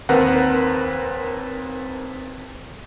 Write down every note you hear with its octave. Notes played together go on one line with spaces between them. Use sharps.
D#2 C4 A#4 B4 F#5